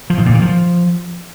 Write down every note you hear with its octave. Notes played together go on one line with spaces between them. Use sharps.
F3
G#2
A#2
D#3
F3